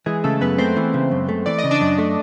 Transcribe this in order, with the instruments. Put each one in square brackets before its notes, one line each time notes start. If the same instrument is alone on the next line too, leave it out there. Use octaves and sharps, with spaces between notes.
[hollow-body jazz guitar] E3 [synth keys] G#3 G#4
[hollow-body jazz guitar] C#3 [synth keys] A3 A4
[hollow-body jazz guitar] F#2 [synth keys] B3 B4
[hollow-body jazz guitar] A3 [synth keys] C4 C5
[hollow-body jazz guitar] E3
C#3
F#2
A3
[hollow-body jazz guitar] E3 [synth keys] D5
[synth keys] D#5
[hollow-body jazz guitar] C#3
[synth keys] D4 D5
[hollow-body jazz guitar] F#2
A3